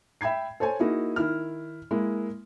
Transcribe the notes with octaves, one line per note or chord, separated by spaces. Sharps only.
E5 G5 B5 G#6 C7
A4 C5 C#5 G#5
A#3 D#4 E4 F#4 G#4
D#3 E4 F6
G#3 A#3 E4